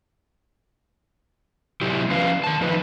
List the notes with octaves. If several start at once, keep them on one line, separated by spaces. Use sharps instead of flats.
C3 F#3 E4 G4
F3 C#4 B4 F5
D#3 A5
F3 D#4 B4